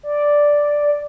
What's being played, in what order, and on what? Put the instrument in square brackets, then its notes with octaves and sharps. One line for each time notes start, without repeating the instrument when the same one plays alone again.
[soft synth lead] D5